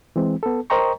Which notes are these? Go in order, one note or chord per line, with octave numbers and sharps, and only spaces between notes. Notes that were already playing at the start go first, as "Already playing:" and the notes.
E3 G#3 C4
B3 A4
A#4 C5 D#5 G5 A#5 C#6